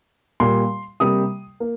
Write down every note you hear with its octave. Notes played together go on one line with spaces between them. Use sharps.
A#2 G3 A#3 C6
C3 G3 A#3 D#6
A#3